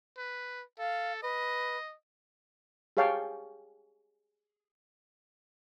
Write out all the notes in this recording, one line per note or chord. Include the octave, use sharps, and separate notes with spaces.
B4
A4 F5
B4 D#5
G4 G#4 C#5 F5 G5 A5